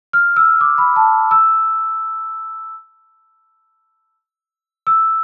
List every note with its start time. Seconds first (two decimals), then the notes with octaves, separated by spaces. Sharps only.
0.13 F6
0.37 E6
0.61 D6
0.78 B5
0.96 A5
1.31 E6
4.87 E6